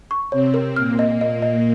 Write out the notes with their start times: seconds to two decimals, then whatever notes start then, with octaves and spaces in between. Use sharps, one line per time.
0.11 C#6
0.32 C3 C4 C#5
0.54 A#4
0.76 A#2 A#3 F6
0.99 D#5
1.21 D#5
1.42 D#5